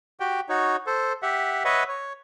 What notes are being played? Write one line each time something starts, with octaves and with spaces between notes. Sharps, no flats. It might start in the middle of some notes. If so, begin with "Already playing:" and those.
F#4 G4 G5
D#4 F#4 C#5
A4 C5
G4 E5 F#5
B4 C#5 D#5 E5 F#5
C#5